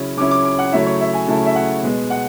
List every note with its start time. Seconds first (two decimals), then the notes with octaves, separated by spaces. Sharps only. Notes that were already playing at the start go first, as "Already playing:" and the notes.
Already playing: C#3 F#3 C#4 E4
0.17 C#3 F#3 C#4 E4 D6
0.31 D6
0.45 D6
0.59 F#5
0.72 C#3 F#3 A3 E4 E5
0.86 C#5
1.01 E5
1.13 G#5
1.28 C#3 F#3 A3 E4 A5
1.46 E5
1.55 F#5
1.83 B2 G#3 B3
2.10 F#5